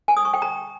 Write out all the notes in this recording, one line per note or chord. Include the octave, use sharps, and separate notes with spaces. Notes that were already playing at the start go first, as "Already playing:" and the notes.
G#5
D#6
C#6
G5
A#5